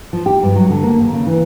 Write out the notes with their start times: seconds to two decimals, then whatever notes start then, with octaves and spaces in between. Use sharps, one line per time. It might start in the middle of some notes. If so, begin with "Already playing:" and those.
0.13 F3
0.26 G4
0.43 G2
0.55 F#3
0.70 D3
0.83 A#3
1.01 D#2
1.13 C#3
1.26 E3